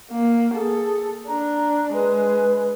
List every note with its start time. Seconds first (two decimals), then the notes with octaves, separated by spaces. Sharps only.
0.10 A#3
0.54 G#4 A4
1.28 D4 A#5
1.94 G#3 B4